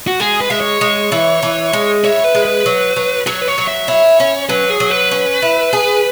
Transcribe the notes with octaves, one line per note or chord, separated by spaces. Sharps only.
F#4
G#3 G#4
B4
G#3 E5
C#5
G#3
E3
E3
G#3
E4 C#5
B4
G#3
B4
F#3
F#3
F#3 C#5
B4
C#5
F#3
E5
E4 C#5
C#4
F#3 B4
G#4
F#3
B4
C#4
E4
G#4